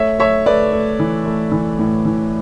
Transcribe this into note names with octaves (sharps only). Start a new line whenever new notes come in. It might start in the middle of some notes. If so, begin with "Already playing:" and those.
Already playing: A3 C#5 E5
A3 C#5 E5
A3 B4 D5
A3
E3
A3
E3
A2
E3